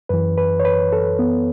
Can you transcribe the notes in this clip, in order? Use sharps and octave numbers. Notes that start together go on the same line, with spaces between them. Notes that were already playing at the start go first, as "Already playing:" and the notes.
F#2 E3 B4
B4
C#5
B4
A4
B3